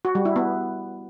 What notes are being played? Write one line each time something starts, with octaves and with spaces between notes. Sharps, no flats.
F#4
G3
E4
B3